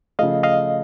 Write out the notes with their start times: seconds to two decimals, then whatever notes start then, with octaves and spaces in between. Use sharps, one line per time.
0.19 C#3 F3 A3 D#5 F5
0.43 D#5 F5